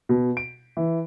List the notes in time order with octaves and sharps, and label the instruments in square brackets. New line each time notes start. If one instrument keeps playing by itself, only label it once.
[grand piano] B2
D7
E3